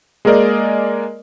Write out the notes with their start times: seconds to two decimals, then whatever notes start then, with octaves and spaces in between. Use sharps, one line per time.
0.25 G#3 A#3 G#4 A#4 D5 D#5